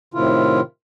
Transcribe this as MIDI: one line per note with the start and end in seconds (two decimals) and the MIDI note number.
0.14 0.61 45
0.14 0.61 48
0.14 0.61 51
0.14 0.61 64
0.14 0.61 65